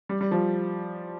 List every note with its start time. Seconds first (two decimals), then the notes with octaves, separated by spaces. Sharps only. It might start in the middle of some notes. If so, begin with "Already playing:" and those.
0.09 G3
0.21 G3
0.31 F3